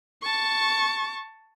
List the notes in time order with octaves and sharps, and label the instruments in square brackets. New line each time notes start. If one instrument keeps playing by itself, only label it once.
[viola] A5 C#6